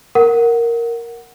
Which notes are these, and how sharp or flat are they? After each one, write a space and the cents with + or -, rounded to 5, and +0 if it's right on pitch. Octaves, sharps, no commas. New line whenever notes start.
A#4 +0 F#5 +0